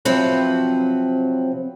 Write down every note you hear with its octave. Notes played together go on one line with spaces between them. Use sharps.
C3 F3 F#3 C4 B4